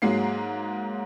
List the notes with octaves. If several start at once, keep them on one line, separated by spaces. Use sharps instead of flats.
G#2 F#3 G#3 A#3 C7